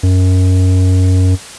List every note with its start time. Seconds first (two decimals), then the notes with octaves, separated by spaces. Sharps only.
0.03 F#2